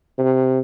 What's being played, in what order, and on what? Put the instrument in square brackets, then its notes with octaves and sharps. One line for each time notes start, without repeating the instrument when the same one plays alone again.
[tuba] C3